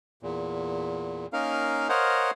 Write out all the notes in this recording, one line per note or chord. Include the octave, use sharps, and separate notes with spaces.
E2 A#2
A#3 C#4 D#4 A#4 F5
A#4 C5 C#5 D#5 F5 F#5